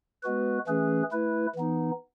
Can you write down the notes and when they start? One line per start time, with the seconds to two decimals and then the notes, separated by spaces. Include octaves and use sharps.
0.23 G#3 B3 F#4 B4
0.67 E3 A3 C#4 G#4 B4
1.11 A3 E4 B4
1.55 E3 B3 D#4